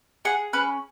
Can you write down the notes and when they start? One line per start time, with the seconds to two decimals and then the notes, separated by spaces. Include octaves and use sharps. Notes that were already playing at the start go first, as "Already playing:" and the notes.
0.25 G#4 F#5
0.53 C#4 B4